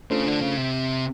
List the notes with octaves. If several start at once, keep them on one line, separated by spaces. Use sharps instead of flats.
C#3 A3 D4 F4 A4 C5
D3
C#3
C3